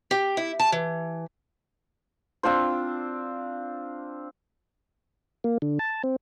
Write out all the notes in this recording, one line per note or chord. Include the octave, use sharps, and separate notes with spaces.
G4
E4
A5
E3
C4 D4 F4 C5
A#3
D3
A5
C4